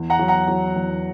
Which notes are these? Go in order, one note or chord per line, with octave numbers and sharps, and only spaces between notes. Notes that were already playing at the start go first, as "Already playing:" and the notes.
Already playing: E2
F#5 A#5
F#3
F#5 A#5
F#3
E2